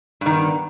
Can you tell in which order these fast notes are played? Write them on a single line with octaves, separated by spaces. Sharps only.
G2 D#3 B3